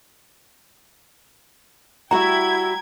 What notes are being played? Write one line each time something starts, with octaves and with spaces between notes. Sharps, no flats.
G3 E4 F#4 F#5 G5 A#5 G#6